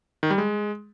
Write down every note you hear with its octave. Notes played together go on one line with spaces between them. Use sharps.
D#3
G3
G#3